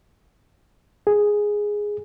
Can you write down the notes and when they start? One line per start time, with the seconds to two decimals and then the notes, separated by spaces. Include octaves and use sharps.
1.07 G#4